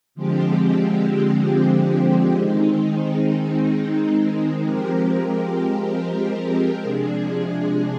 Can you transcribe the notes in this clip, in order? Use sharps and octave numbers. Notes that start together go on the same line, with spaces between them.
D3 F3 G#3 C4 G4
D#3 G#3 C4 D#4
F3 G#3 C4 G4 A#4
C3 F3 G#3 D4 G#4